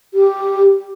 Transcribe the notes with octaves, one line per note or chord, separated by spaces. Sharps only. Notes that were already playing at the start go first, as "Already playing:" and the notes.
G4